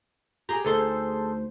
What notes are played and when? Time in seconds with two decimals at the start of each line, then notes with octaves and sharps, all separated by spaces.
0.49 G4 G#4 A#5
0.65 D2 D#4 G#4 A4 C5 C6